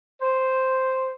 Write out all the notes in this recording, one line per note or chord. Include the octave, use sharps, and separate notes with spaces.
C5